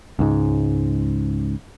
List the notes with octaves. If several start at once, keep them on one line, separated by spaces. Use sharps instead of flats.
C#2 G#2